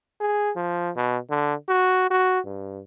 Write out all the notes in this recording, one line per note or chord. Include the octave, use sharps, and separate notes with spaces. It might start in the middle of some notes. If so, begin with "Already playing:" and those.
G#4
F3
B2
D3
F#4
F#4
G2